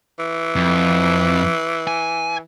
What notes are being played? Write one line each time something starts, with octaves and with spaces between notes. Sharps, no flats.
E3
F2
G#5